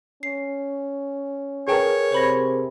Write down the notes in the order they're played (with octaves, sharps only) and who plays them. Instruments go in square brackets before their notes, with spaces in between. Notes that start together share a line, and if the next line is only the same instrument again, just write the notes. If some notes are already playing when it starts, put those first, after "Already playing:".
[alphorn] C#4 [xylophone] C7
[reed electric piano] G#4 A#4 [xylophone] B4 G5 A5 [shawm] C#5
[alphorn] C3 [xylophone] C5 B5 A#6